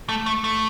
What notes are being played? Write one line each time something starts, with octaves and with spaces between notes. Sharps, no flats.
A3
A3
A3